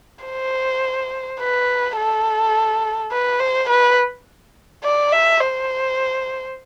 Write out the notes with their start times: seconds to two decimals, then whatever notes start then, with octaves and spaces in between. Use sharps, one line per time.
0.24 C5
1.40 B4
1.97 A4
3.12 B4
3.40 C5
3.69 B4
4.84 D5
5.12 E5
5.41 C5